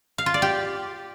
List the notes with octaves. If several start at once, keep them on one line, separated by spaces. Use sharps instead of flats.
F5
F4
D5
G4